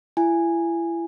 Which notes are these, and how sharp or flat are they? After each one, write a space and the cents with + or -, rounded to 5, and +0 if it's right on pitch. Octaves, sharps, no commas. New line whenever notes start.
E4 +35 G#5 -5